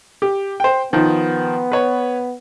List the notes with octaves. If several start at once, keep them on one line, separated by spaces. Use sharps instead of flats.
G4
C5 G5
D#3 F3 B3
B4 C#5